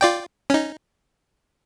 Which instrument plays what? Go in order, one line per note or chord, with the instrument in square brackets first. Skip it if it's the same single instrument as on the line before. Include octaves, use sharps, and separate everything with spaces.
[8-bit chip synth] F4 D5 G5
C#4 D#4